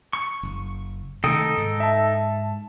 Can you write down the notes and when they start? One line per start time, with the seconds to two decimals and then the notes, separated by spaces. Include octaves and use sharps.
0.13 C#6
0.43 F#1
1.24 C3 D#3 A3 D#4 A4 G5 D#6 C#7
1.58 G#2
1.80 E5 A5